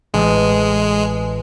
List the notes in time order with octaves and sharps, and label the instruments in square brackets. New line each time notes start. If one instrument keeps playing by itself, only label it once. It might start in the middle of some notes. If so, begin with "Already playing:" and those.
[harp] A1 D#6 [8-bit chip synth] G#3